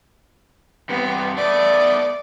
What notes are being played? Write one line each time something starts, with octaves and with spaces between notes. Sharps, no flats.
G2 C3 B3
A3 B3 D5